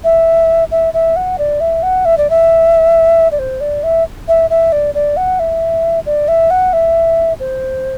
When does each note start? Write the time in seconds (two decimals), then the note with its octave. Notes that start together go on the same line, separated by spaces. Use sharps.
0.04 E5
0.71 E5
0.94 E5
1.16 F#5
1.38 D5
1.60 E5
1.83 F#5
2.05 E5
2.18 D5
2.30 E5
3.32 D5
3.39 C5
3.61 D5
3.83 E5
4.28 E5
4.50 E5
4.72 D5
4.95 D5
5.17 F#5
5.39 E5
6.06 D5
6.28 E5
6.50 F#5
6.73 E5
7.40 C5